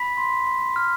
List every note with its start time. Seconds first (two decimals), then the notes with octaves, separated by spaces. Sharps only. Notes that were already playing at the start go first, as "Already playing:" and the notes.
Already playing: B5 B6
0.17 C6
0.47 C6
0.76 F6